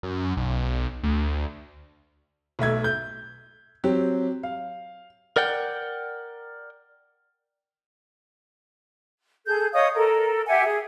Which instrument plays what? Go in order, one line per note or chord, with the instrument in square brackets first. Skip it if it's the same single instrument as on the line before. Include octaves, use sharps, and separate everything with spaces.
[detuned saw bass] F#2
B1
D2
[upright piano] B1 A3 E5 G#6
G6
F#3 C4 G4
F5
[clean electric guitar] A#4 D5 F#5 G5
[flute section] G#4 A4 G6
C#5 D#5 F5 D#6
A4 A#4
G4 E5 F#5 G#5
G#4